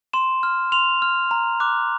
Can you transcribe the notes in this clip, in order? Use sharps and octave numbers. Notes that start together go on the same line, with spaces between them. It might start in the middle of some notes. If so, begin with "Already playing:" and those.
C6 E7
F6
C6 F7
F6
A#5
D6 F#6